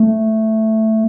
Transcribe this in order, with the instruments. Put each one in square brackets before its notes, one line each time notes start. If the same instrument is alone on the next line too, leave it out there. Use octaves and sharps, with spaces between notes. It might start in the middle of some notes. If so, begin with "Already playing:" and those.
Already playing: [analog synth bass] A3